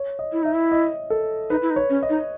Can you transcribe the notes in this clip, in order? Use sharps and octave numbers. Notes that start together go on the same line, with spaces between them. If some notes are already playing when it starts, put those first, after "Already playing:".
Already playing: C#5
D#5
E4
D#4 E5
E4
D#5
A4
D#4 B4
E4
D#4
C#5
C#4
D#5
D#4